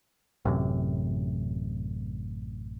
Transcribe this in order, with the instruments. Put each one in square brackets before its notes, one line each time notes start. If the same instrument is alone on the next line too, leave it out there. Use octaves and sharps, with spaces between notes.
[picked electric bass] A1 F#2 C3